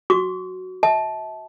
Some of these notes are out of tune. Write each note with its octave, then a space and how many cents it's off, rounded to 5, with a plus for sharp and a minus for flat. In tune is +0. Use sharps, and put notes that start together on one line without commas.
F#4 +0 C#6 +45
E5 -40 A5 -20